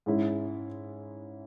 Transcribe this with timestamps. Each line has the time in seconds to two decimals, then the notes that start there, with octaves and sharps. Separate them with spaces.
0.06 G#2 G#3 C#4 E4